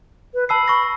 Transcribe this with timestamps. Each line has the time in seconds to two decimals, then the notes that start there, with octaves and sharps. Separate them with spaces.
0.34 B4
0.49 A5 B5 E6 C7
0.68 C#6 A#6